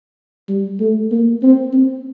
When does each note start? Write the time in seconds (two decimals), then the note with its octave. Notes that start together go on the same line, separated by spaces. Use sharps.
0.48 G3
0.80 A3
1.11 A#3
1.43 C4
1.73 C4